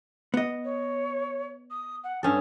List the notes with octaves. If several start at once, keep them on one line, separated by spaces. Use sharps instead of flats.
B3 D#5
C#5
D#6
F#5
G2 C#4 A4 D#6